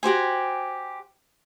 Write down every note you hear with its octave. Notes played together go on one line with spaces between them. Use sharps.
F#4 G4 C5 G#5